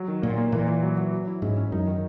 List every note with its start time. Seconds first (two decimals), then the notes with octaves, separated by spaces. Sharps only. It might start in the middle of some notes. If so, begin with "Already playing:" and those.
Already playing: F#3
0.08 D#3
0.22 A#2 A#3
0.38 A#3
0.52 A#2 E3
0.68 E3
0.83 F#3
0.97 F#3
1.12 F#3
1.27 E4
1.42 G#2 C#4
1.57 C#4
1.72 F#2 D#4
1.87 D#3